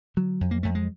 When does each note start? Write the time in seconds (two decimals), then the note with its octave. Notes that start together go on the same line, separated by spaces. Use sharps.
0.17 D3 F#3
0.41 F2
0.51 A#3
0.63 F2 A3
0.75 G#3